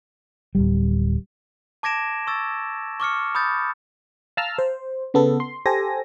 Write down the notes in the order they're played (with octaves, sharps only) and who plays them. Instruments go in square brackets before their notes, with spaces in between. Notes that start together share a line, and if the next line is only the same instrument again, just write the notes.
[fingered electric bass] D1 A#1 G3
[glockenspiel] A5 D6 G#6 A#6 D7 E7
C#6 E6 A6
C#6 D6 F6 C#7
B5 D#6 G6 A6
[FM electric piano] F5 A5 A#5 E6 F6
C5
C#3 B3 A4
C6
G4 A4 C5 G#5 A#6